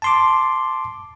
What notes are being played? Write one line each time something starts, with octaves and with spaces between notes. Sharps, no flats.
A5 C6 D6